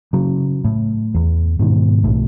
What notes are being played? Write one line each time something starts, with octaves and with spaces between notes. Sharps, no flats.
C#3 F#3
A2
E2
G#2 B2 D#3
B1 A2